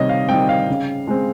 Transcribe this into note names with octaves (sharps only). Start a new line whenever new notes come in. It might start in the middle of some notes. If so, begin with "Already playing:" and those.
Already playing: C3 D#3 G3 C#5 D#5
F5
D#3 G3 C4 G5
F5
C#3
G#3 C4